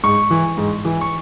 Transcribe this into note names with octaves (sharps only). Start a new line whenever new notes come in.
G#2 C#6
E3
G#2
E3
C#6